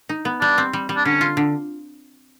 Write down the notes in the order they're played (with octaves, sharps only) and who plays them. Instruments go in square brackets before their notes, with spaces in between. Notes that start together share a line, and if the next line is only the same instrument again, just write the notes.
[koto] D#4
B3
[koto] G3 [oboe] D4
[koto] C4
G3
G3
[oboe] D4
[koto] D3 [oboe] C#4
[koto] F4
D3